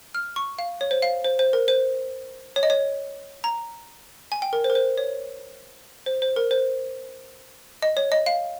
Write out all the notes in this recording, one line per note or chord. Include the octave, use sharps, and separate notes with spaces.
F6
C#6
F5
C#5
C5
F5
C5
C5
A#4
C5
C#5
D#5
C#5
A#5
G#5
G5
A#4
C5
A#4
C5
C#5
C5
C5
A#4
C5
D#5
C#5
D#5
F5